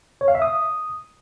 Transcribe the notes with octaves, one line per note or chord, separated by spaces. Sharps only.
C#5
F5
E5
D#6